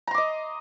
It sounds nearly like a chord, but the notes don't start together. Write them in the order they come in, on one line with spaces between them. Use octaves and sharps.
A#5 C6 D6 D#5